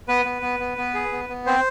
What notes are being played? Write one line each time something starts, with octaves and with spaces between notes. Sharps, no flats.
B3 B4
B3
B3
B3
B3
G#4
B3
B3
C4 C5